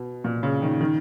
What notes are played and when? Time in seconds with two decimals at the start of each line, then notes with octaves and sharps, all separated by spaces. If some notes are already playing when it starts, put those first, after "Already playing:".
Already playing: B2
0.24 A#2
0.43 C#3
0.62 D#3
0.81 D#3